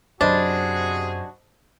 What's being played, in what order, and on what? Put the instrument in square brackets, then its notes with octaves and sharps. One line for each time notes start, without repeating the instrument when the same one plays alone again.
[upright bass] F#2 [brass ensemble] C3 F#4 G#4 [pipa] D4 [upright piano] C5 D#5 B5